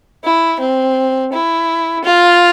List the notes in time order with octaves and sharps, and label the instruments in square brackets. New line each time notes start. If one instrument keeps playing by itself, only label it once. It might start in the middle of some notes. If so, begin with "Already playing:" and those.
[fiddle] E4
C4
E4
F4